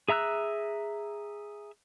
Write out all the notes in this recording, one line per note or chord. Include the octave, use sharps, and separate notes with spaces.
G#4 E5 A#5 E6 F#6